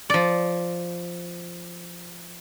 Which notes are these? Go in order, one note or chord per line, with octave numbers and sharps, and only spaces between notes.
F3 D5